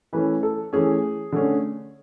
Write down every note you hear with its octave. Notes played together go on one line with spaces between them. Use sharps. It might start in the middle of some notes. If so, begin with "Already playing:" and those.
E3 A3 C#4 B4
A4
E3 A3 C#4 G#4
D3 A3 C#4